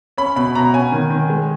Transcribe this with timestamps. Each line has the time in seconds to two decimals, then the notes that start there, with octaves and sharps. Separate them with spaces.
0.17 C#4 B5
0.36 B2 B5
0.55 B2 A#5
0.74 C#4 G#5
0.92 D#3
1.10 D#3
1.30 G#3